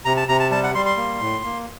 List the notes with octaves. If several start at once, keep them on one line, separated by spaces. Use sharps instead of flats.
C3 A#5
A5
C3 A#5
A5
G3 A5
F#5
G3 C6
C6
A#3
A2
A#3